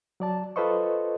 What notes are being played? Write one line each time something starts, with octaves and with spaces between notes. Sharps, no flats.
F#3 D5 A5
F4 A4 B4 C5 D#5 C#6